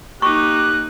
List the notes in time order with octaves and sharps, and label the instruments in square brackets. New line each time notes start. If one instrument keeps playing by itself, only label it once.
[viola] A#3 D#4 [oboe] G4 [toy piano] C#6 [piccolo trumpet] F#6